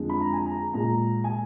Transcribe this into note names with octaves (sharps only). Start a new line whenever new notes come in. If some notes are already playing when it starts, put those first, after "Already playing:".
Already playing: F2 D3 G#3
B5
A#5
G#5
A#5
A#2 G#3 A#5
G#5